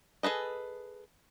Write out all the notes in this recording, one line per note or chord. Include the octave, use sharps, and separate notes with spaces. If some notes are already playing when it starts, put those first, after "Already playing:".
G#4 A4 B4 D#5